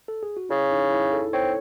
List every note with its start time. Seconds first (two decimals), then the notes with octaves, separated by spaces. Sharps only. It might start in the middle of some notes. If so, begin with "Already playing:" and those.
0.08 A4
0.23 G#4
0.37 F#4
0.49 C#3 E4
0.71 D#4
0.91 E4
1.13 A4
1.33 C4 C#5